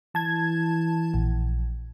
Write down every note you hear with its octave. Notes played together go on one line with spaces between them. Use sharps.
E3 A5 G#6
A#1